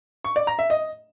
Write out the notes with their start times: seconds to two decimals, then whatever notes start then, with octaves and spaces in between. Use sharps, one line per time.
0.24 C#6
0.36 D5
0.47 A#5
0.59 E5
0.70 D#5